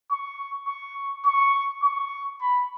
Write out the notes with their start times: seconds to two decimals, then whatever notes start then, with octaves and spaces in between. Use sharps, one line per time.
0.12 C#6
0.68 C#6
1.26 C#6
1.84 C#6
2.41 B5